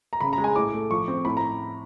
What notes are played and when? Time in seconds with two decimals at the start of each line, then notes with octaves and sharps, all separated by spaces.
0.13 A#5
0.20 C#3 B5
0.33 A#5
0.38 G#3
0.44 G#5
0.56 A2 D6
0.73 A3
0.91 F3 C#6
1.08 C4
1.25 A2 B5
1.37 A#5